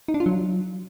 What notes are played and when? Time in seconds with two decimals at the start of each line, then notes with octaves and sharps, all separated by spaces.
0.08 D#4
0.14 D4
0.20 F4
0.26 F#3